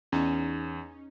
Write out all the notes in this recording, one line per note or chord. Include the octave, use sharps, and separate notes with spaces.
E2 C#4 D#4